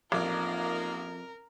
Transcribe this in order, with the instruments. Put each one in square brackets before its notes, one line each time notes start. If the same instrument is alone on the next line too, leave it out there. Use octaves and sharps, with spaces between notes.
[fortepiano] A1 [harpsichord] F2 D5 [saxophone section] A#3 D#4 F4 [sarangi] A#4